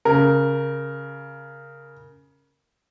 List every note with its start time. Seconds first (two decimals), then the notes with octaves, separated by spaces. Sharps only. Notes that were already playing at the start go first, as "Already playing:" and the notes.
0.05 C#3 A#4